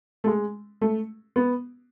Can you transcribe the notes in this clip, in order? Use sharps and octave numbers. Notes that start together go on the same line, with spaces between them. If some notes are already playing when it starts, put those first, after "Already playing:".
A3
G#3
A3
B3